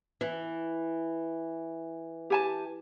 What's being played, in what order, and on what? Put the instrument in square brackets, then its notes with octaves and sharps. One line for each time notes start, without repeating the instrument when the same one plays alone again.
[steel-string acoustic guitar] E3
[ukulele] G4 G#5 A5